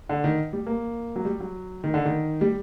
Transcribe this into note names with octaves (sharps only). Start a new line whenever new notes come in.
D3
D#3
G3
A#3
F#3
G3
F#3
D#3
D3
D#3
G3